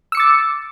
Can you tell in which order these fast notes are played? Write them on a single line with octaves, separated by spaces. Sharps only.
E6 C#7 D6 A6